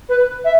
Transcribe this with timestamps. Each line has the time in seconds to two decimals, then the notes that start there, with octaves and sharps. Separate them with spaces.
0.09 B4
0.44 E5